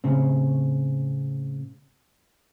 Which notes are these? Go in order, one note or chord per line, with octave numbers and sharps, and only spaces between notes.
A2 C#3 C4